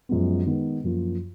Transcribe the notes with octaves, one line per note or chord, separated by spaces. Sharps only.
F#2 F3 G#3 B3
D#3 G#3 B3
F#2 F3 A#3